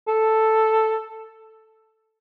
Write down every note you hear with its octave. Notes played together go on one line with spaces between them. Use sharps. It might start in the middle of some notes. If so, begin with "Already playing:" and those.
A4